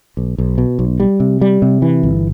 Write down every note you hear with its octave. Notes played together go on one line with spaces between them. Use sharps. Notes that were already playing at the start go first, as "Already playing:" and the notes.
B1
B1
B2
B1
G3
C3
G3
C3
E3
G1